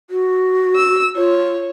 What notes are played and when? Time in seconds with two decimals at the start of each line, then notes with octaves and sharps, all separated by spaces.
0.10 F#4
0.76 E6
1.16 F4 C#5